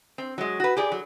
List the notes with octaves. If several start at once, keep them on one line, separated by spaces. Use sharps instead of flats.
C4
F#3 G#3
F#4 B4
G4 G#4 D5
F#3